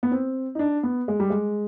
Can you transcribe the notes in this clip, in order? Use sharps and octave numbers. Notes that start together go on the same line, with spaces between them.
B3
C4
D#4
D4
B3
G#3
G3
G#3